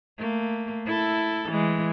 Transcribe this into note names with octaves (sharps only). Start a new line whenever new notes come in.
A3 A#3
E4 A4
E3 G#3